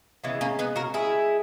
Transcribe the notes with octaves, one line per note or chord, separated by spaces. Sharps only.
C#3 E3 G#3 B3
A#3 C#4
B3 D#4
F#4 A#4
E4 G#4